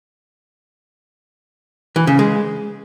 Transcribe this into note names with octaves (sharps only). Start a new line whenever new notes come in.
E3
C#3
G#3